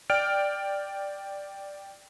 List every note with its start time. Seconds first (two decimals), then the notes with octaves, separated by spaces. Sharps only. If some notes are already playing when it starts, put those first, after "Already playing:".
0.10 D5 G5 F6 D7